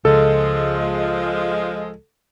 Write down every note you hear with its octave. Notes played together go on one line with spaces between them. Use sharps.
C#2 F3 G#3 A4